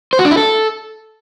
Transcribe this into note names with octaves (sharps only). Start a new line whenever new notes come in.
C5
F#4
D4
E4
A4